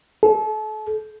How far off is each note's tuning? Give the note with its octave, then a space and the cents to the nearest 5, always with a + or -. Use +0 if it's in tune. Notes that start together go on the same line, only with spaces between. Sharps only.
A4 -35